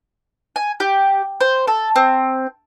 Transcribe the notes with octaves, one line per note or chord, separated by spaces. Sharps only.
G#5
G4
C5
A4
C4